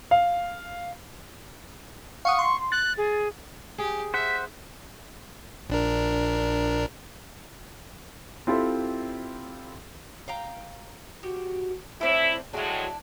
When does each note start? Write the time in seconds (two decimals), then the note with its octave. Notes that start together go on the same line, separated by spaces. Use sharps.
0.11 F5
2.25 F5 F#5 C#6 D#6
2.39 C6
2.72 F#6 A6
2.98 G#4
3.78 G4 G#4
4.14 C5 E5 F#5 B6
5.69 A#1 D4 A#4
8.47 C4 E4 F4 G4 A4 C5
10.28 F5 G5 A#5
11.23 F#4 G4
12.01 A2 C4 E4 D5
12.53 A2 F#3 G#3 D4 E4